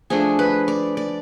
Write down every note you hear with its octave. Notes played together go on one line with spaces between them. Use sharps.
F3 A3 D4 G#4
B4
D5
D5